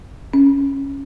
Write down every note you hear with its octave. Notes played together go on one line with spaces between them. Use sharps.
C#4